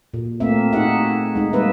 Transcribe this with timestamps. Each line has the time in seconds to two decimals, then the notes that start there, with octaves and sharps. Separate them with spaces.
0.14 A#2
0.40 A3 A#3 C4 E5
0.73 D#4 F#4 G#4 E5 F#5
1.35 G#3 D#4
1.53 G3 A#3 B4 E5